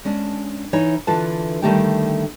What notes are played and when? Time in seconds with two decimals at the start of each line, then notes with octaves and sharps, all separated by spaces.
0.05 G#3 C#4 D4
0.73 E3 D#4 E4 C#5 G#5
1.07 D3 E3 F4 A4 B4 A5
1.62 D3 D#3 G3 A3 G4 G5